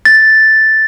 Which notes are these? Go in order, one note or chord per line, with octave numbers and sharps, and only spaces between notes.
A6